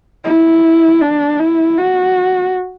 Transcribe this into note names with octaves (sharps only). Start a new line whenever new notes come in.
E4
D4
E4
F#4